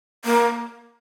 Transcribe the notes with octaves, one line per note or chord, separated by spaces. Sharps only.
A#3